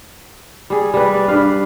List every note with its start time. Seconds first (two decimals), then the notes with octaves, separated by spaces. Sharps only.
0.70 G3 G#4
0.94 G3 B4
1.14 D5
1.28 G2 B4 F5